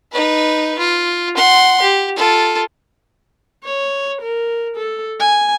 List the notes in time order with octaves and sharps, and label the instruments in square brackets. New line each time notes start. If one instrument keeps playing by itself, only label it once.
[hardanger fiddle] D#4 B4
F4
F#5 C6
G4
F4 A4
[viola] C#5
A#4
A4
G#5